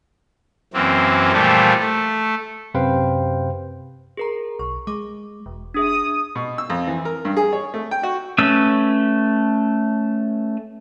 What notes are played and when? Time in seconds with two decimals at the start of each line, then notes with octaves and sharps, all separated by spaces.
0.74 F#2 E3 A#3 C4
1.33 A#2 E3 F3 G3 A3
1.79 A3
2.74 F#2 C3 B4 C5 F5 G5
4.17 G#4 A#4 A#5
4.59 B1 C#6
4.87 G#3 D6
5.46 E1
5.74 D4 G#4 E5 D#6
6.35 B2
6.58 E6
6.70 F2
6.87 E3
7.05 A#4
7.25 G2
7.37 G#4
7.53 C#5
7.74 A3
7.91 G5
8.03 F#4
8.38 A3 C#4 B4 E6